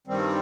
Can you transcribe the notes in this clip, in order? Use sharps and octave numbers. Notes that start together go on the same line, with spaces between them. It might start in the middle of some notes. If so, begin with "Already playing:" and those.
G2 D#3 G3 C4